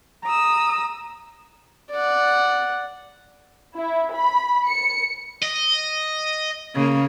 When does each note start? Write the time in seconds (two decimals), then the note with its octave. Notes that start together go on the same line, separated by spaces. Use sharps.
0.24 A#5 D#6 E6
1.91 D5 F#5
3.77 E4
4.14 B5
4.67 C#7
5.42 D#5
6.75 C#3 A#3